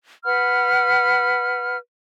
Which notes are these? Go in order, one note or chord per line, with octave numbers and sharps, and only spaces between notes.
B4 F#5 B5 F6